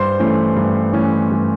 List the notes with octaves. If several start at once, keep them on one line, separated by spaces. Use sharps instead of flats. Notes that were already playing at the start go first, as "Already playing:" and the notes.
Already playing: G2 C5 C6
E3 A3 C#4
G2
E3 A3 C#4
G2